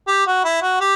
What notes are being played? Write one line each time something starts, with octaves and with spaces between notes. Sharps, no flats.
G4
F#4
E4
F#4
G4